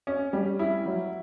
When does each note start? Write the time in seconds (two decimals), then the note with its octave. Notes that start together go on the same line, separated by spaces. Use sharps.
0.07 C#4
0.33 G3
0.59 E4
0.86 F#3